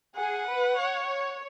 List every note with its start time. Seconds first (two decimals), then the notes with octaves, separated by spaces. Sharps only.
0.16 G#4 F#5
0.47 B4
0.78 C#5